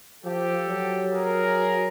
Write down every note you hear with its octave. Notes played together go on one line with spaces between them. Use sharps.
F3 G4 A4
F#3
G#4 A#4